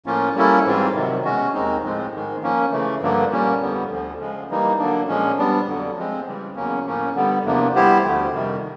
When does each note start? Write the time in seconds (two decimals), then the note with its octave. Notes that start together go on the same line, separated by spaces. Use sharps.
0.06 A2 F3 A#3 C#4 F4
0.35 G3 A#3 C#4 E4 A4
0.65 G#2 E3 G3 C4 F4
0.94 C3 D#3 F#3
1.24 B2 G#3 C#4 F#4
1.53 D#2 D#3 G#3 C4 D#4
1.83 A2 F3 G#3 C4
2.13 G#2 D#3 G#3
2.43 F3 A#3 C#4
2.71 C#3 E3 A3
3.01 G2 D3 F3 A#3 D4
3.31 A#2 G3 A#3 C#4
3.61 F2 D3 G3 B3
3.91 D2 D3 F3
4.19 C#3 F3 G#3
4.50 E3 G3 A#3 D#4
4.78 D3 F#3 A#3 D4
5.08 A#2 F3 G#3 C#4
5.38 G3 B3 D4
5.67 F2 D3 F#3
5.96 F3 G#3 C4
6.27 C#3 E3 G3
6.56 E2 C#3 F#3 A#3 C#4
6.86 A2 F3 A#3 C#4
7.15 D3 G3 B3
7.45 E2 C3 F3 A#3 D4
7.75 G3 B3 E4 G4 C5
8.04 D2 D3 F3 A3
8.33 F2 C3 D#3 G3